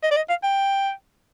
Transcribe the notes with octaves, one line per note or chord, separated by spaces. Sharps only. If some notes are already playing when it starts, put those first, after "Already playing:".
D#5
D5
D#5
F5
G5